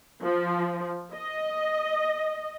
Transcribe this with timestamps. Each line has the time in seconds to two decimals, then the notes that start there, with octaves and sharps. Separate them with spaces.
0.22 F3
1.14 D#5